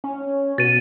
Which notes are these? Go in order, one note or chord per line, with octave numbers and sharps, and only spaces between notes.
C#4
B2 A6 D#7